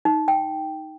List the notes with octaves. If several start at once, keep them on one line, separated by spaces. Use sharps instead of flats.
D#4
G5